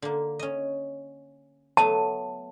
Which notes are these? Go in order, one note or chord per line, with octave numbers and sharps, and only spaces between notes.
D3 A#3
C#4 D#5
F#3 A3 B3 A5